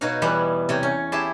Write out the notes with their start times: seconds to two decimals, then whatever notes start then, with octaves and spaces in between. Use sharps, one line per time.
0.01 B2 D#4 F#4 C#5 F5
0.22 E2 E3 G3 B3 F#5 B5
0.69 C3 C#5 G5
0.83 C#4
1.12 E4 G4 G#4 A5 C6